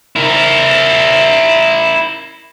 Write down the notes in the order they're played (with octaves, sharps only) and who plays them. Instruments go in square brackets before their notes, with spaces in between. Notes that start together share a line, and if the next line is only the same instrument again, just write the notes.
[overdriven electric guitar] E4 A#4